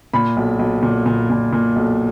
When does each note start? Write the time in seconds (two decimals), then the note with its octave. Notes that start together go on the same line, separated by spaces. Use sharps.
0.14 A#2 B5
0.37 B1
0.59 B1
0.83 A#2
1.06 A#2
1.30 A#2
1.53 A#2
1.76 B1